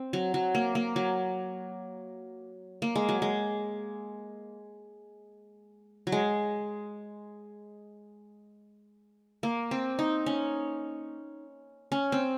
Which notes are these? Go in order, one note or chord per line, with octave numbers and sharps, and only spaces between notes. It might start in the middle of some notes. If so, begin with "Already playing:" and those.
Already playing: C4
F#3
F#3
A#3
A#3
F#3
A#3
G#3
F#3
G#3
F#3
G#3
A#3
C4
D#4
C#4
C#4
C4